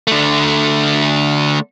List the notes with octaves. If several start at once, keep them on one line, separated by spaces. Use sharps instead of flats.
D3 A3